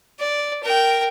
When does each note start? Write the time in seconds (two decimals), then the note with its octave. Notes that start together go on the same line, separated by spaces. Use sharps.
0.19 D5
0.63 A#4 G5